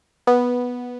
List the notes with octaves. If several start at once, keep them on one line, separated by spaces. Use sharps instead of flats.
B3